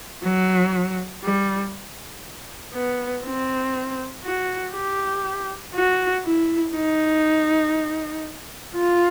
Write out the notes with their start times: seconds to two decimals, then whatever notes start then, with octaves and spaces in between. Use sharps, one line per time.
0.23 F#3
1.24 G3
2.74 B3
3.25 C4
4.24 F#4
4.74 G4
5.75 F#4
6.24 E4
6.74 D#4
8.74 F4